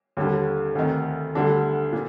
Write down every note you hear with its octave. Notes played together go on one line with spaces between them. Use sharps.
D#2 D3 G3
D2 C3 D#3
D2 D3 G3 D4 A4
A#2 F3